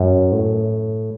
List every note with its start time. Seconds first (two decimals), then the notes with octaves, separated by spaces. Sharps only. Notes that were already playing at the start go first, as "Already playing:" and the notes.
Already playing: F#2
0.32 A2